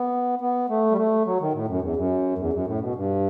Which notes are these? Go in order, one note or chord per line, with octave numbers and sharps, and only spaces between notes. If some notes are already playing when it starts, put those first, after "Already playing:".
Already playing: B3
B3
A3
G3
A3
F#3
D#3
A2
F#2
E2
F#2
E2
F#2
A2
B2
G2